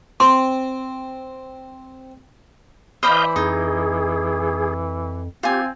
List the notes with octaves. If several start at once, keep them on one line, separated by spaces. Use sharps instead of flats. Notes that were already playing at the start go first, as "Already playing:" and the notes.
C4 C6
E3 C5 D5 D#5 F5 B5 G6
F2 D#4 G#4
C4 F4 G4 G#5